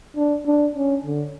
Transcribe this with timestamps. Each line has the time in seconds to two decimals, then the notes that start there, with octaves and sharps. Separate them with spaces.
0.17 D4
0.46 D4
0.75 C#4
1.04 D3